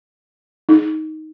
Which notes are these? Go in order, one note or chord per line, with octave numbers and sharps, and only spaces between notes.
D#4